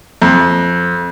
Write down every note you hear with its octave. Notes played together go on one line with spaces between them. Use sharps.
F2